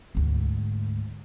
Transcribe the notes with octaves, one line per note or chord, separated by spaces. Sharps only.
D2 G#2